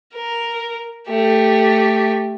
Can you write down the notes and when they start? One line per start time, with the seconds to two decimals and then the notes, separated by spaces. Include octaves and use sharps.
0.15 A#4
1.09 A3 G4